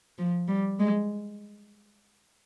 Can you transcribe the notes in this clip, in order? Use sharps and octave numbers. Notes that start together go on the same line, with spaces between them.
F3
G3
G#3